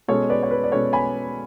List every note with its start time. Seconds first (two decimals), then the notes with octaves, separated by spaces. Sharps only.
0.08 B2 G#3 C#4 A4 C#5
0.29 B4 D5
0.43 C#5
0.51 B4
0.64 D5
0.72 B2 G#3 C#4 A4 C#5
0.93 G#5 B5